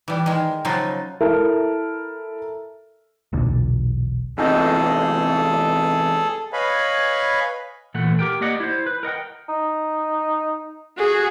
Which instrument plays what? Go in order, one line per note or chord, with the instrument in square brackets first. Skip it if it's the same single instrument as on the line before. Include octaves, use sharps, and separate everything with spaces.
[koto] E3 G3
D#3 G#3
C#3 F3 F#3 D#4 F4
[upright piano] E4 A4 A#4 E5
[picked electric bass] E1 B1 A#2 D3
[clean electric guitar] E2 C3 D#4 [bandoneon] G#4 A4
[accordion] B4 C#5 D#5 F5 G#5 B5
[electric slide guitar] A#2 E3 A3 F#5
G4 A#4 G5
A#3 G4 D5 D#5 F#5
E4 C5
B4
A#4 D#5 F#5 G5
[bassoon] D#4
[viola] F#4 G#4